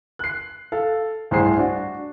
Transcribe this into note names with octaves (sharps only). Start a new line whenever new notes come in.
F#6 C7
A4 F5
C2 A2 G#4 C5 C7
D4 F#4